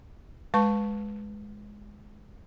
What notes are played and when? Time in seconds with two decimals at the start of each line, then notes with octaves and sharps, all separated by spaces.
0.54 G#3 B4 A5 C#6